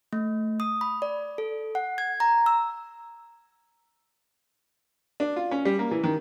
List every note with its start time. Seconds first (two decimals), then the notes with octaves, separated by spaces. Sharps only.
0.13 A3
0.60 D#6
0.81 B5
1.02 D5
1.38 A4
1.75 F#5
1.98 G#6
2.20 A#5
2.46 E6
5.20 D4
5.36 F4
5.51 C#4
5.65 G3
5.79 A#3
5.91 E3
6.04 D#3